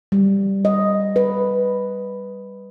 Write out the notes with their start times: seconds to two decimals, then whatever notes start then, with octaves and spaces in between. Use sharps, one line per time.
0.12 G3
0.65 D#5
1.16 B4